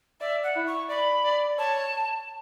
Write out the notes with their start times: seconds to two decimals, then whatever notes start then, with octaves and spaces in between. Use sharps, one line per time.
0.20 D5 E5
0.43 F#5
0.56 E4
0.67 C#6
0.89 D5 B5
1.25 D5
1.58 C#5 A5